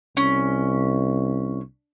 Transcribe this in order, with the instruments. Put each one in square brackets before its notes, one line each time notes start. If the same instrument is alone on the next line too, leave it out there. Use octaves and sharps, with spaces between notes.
[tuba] C2 [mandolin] C#4